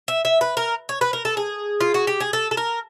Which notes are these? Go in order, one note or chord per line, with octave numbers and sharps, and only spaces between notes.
E5
E5
B4
A#4
C#5
B4
A#4
A4
G#4
F4
F#4
G4
G#4
A4
A4
A#4